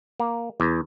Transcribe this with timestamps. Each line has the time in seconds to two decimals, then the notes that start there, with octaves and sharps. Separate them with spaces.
0.20 A#3
0.60 E2